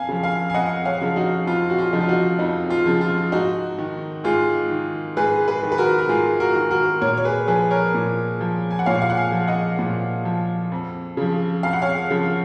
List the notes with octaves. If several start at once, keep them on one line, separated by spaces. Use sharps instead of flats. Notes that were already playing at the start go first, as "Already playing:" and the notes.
Already playing: F2 F5 G#5
C#3 F3
F5 G#5
G#5
F2 D#5 F#5
C#5 F5
C#3 F3
D#4 F#4
F2 F4
F#4
F4
C#3 F3 D#4
F4
D#4 F#4
F2 D#4
F4
C#3 F3
F4
G#2 D#4 F#4
D#3
G#2 F4 G#4
D#3
G#2 G#4 B4
G#4 B4
D#3
B4
F#4 A#4
A#4
G#2 F4 G#4
F#4 A#4
D#3
F#4 A#4
A#2 A#4 C#5
C#5
G#4 B4
F3 G#4 B4
A#4 C#5
A#2
F3
G#5
F#5
A#2 C#5 F5
F5
F#5
F5 G#5
F3
D#5 F#5
A#2
F3
F2
C#3 F3
F2 F5
F#5
C#5 F5
C#3 F3